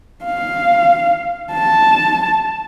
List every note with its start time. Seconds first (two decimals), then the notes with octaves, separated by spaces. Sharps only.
0.25 F5
1.53 A5